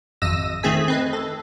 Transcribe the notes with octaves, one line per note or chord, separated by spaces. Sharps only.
G#1 F2 D#5 E6 A#6 D#7
D#3 A3 C4 G#4 G#5 B6
C4 B4 D#5
A4